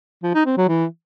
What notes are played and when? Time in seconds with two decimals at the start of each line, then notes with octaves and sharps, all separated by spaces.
0.24 F3
0.35 D#4
0.46 C4
0.57 F#3
0.69 E3